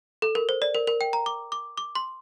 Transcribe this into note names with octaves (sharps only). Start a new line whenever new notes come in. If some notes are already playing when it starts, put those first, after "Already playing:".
A4
A#4
C5
D5
A#4
A#4
G5
A#5
D6
D6
D6
C6